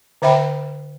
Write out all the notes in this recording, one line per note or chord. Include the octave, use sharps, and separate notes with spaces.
D3 C5 E5 G5 B5